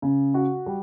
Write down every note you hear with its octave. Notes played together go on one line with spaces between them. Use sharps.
C#3
F#4
G3